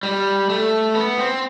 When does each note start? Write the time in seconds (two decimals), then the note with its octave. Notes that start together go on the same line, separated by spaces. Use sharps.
0.03 G3
0.49 A3
0.95 B3
1.19 C4